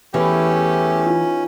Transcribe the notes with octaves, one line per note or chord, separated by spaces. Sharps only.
E2 E3 A3 C#4 G4
D#4 F4